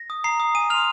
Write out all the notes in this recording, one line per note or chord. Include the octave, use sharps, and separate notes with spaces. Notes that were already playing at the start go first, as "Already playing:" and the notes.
Already playing: A#6
D#6
A#5 C7
D#6
G#5 D#7
C6 F6 F7